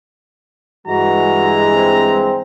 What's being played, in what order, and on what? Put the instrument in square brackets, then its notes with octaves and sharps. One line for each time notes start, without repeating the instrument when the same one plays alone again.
[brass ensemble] G2 E3 G#3 [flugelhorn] F#4 [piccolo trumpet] A#5
[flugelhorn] C4